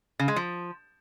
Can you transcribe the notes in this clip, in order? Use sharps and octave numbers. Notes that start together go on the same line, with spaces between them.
C#3
G#3
F3